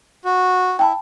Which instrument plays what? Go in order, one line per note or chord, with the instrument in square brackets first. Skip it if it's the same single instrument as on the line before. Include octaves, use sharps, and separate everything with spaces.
[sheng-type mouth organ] F#4
[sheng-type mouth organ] E4 [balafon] G5 A5 B5